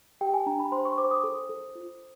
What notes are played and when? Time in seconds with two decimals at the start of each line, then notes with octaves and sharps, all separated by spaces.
0.21 G4 G5
0.34 G#5
0.46 D4 A#5
0.59 B5
0.72 C5 C6
0.85 C#6
0.98 C5 D6
1.11 D#6
1.24 A4
1.49 A4
1.75 F4